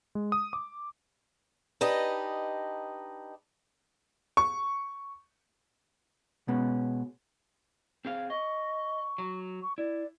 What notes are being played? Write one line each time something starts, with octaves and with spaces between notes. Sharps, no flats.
G#3
D#6
D6
D4 D#4 G4 B4 D#5
C#6
B2 G#3 B3 C#4
C4 G#4 F5
D#5 C#6
F#3
C#6
E4 D5